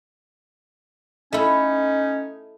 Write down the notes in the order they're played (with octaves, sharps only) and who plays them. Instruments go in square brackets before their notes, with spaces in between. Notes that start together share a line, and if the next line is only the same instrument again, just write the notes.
[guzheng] A3 E4 [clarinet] C#4 [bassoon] D#4